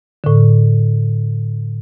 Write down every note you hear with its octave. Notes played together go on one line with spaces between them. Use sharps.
A2 D3